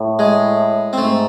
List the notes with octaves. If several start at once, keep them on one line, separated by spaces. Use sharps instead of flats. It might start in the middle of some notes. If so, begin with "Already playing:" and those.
Already playing: A2
G#3
C4
G#2 A3